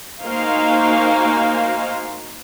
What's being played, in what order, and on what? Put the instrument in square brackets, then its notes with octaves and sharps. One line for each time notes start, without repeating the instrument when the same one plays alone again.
[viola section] A#3 D#4 F#4 C5 F5 G#5